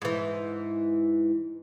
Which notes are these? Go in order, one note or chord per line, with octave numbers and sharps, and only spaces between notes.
G#2 E3